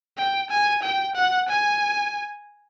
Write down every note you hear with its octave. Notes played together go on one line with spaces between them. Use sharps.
G5
G#5
G5
F#5
G#5